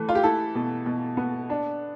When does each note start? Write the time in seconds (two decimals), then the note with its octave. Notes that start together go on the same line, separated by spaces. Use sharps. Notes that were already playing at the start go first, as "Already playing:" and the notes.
Already playing: E3 A3
0.09 F4
0.15 G4
0.23 E4 A4
0.55 B2
0.86 B2
1.17 B3
1.50 D4